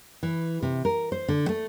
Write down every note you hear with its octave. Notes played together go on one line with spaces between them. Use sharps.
E3
C3
A#4
C5
D3
A3